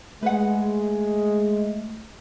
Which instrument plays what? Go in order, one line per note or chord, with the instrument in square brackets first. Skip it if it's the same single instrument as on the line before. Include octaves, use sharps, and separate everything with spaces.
[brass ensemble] G#3 [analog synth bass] A3 [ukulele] B4 F#5